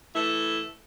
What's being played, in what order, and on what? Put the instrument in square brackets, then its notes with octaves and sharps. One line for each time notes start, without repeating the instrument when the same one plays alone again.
[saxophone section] E3 A3 E4 A4